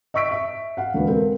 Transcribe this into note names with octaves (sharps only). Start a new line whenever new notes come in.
D#5 E5 C#6 E6 B6 D7
E5
F5 F#5
E1 D2 B4
C4 A#4